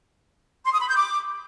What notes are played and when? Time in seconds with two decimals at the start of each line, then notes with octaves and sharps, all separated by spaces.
0.64 C6
0.72 D#6
0.80 B5
0.88 G6
0.96 D6